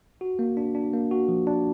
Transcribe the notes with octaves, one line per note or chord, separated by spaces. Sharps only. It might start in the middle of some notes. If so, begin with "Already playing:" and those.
F#4
A#3
D4
D4
A#3
F#4
F3
D4